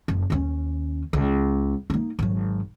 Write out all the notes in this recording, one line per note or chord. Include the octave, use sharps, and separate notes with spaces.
F#1
D#2 C#4
C#2
A#3 D#4
G#1 F#3